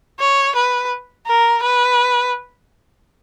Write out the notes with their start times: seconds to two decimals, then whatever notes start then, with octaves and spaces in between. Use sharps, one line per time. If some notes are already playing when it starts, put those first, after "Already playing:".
0.20 C#5
0.55 B4
1.27 A#4
1.62 B4